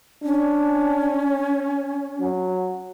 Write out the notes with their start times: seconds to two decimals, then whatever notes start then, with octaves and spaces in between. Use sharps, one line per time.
0.24 C#4 D4
2.21 F#3